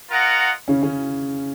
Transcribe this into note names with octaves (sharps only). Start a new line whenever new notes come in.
F4 A#4 D#5 F#5
C#3 C#4
C#3 C#4